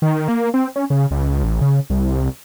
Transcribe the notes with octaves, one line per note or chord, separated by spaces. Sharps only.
D#3
A#3
C4
C#4
C#3
C#2
A1
C#3
C2